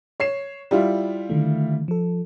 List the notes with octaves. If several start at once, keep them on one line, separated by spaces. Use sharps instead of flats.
C#5 C7 E7
G3 E4 F4
D3 D#3 A3
F3 A4